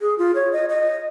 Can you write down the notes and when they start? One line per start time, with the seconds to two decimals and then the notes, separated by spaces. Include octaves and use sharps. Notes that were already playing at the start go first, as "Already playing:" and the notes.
0.01 G#4
0.18 F4
0.35 C#5
0.53 D#5
0.69 D#5